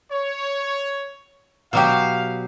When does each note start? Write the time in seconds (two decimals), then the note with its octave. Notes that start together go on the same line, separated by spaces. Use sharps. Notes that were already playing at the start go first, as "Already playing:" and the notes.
0.11 C#5
1.73 B2 F#3 G4 F5